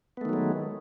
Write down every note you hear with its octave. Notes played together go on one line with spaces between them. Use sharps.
D#3 F#3 G#3 A3 B3